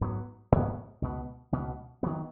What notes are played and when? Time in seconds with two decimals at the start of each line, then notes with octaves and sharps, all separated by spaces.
0.01 G#2 F#3 B3
0.52 G#2 F#3 B3
1.02 C#2 B2 B3
1.52 C#2 B2 B3
2.03 D#3 F#3 B3